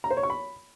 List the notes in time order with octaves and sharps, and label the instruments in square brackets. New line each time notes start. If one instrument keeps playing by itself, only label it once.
[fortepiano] A#5
C5
C#5
C#6
B5